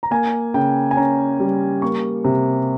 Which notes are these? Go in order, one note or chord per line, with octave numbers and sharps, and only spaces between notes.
A#5
A#3 G#5
C#3 G5
G#5
C#4 A#5
G3
A#3 C#6
C3